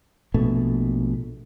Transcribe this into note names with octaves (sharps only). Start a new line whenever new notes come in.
A#1 B2 A3